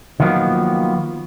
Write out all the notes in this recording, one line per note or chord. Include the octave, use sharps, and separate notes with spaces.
D#3 F3 F#3 A#3 B3